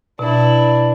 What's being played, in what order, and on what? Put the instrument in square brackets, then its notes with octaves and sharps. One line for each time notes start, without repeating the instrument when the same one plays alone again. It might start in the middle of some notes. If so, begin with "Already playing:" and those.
[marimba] B2 [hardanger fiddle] D4 E4